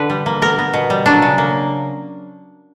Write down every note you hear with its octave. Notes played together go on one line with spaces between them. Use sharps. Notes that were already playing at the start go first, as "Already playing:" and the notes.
Already playing: D3 B4
G3
A#3
B3 A#4
B3
B2
G3
F#3 D4
C#3
A#3